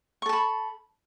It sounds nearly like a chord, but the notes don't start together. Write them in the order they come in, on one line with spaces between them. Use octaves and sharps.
C#6 A4 A5 B5